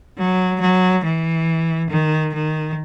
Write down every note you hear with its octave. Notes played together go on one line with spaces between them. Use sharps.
F#3
F#3
E3
D#3
D#3